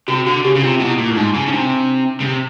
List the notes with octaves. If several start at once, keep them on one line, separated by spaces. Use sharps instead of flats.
C3 F#4
D3 F#4
C#3 G4
C#3
C3 F4
B2 E4
A#2
A2
G#2 D#4
C#3
C#3
C3 D4
C#3
C3